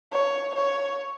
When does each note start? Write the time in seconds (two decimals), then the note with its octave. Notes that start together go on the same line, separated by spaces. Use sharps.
0.12 C#5
0.55 C#5